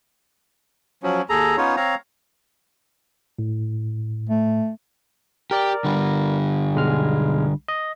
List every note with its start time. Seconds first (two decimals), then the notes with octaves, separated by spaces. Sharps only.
1.03 F3 F#3 C#4
1.29 D#2 G#4 A4 A#5
1.57 B3 C#4 D#4 F4 C#5
1.76 C4 C#5 F5 A#5
3.39 A2
4.29 A3
5.51 G4 A#4 D5
5.85 D3 G3
6.75 B1 G#3 F6
7.68 D#5